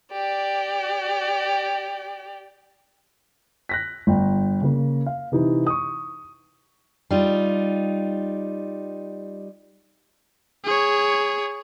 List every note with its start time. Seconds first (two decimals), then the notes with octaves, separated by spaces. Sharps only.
0.12 G4 D5
3.69 F#6 A#6 B6
4.07 G1 G5
4.61 C#3 A#3
5.06 F5
5.32 C3 E3 D#4
5.67 C#6 D#6
7.11 G3 D#4 F4
10.64 G#4 C#5